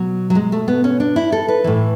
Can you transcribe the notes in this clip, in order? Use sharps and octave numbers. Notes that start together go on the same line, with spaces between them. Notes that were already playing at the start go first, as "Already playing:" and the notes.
Already playing: B2 F#3
F#3
G#3
A3
B3
C#4
D4
E4
A4
B4
A2 E3